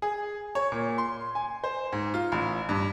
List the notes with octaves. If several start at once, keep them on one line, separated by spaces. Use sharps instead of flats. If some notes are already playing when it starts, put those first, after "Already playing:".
G#4
C#5
A#2
C6
G#5
C5
G#2
F4
A1
G2